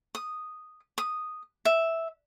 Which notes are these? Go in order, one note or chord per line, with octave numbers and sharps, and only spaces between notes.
D#6
D#6
E5